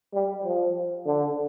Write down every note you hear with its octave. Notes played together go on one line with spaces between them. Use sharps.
G3
F3
D3